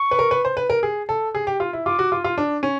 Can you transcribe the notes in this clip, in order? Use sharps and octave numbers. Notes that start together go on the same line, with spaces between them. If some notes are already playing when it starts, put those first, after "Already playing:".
Already playing: C#6
B4
A#4
B4
C5
B4
A#4
G#4
A4
G#4
G4
F4
E4
F4 D6
F#4
F4
F4
D4
C#4